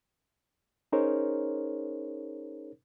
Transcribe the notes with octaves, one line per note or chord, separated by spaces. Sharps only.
C#4 D#4 G#4 A#4 C5 C#5